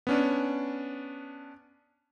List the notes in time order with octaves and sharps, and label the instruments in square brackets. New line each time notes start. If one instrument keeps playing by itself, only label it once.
[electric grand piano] B3 C#4 D4